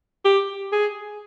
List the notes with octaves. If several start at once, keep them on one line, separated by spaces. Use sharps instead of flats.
G4
G#4